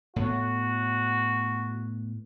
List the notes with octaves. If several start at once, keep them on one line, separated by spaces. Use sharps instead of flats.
A2 B3 F#4